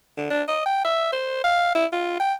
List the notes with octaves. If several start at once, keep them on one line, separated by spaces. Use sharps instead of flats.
D3
D4
D#5
G5
E5
C5
F5
E4
F4
G5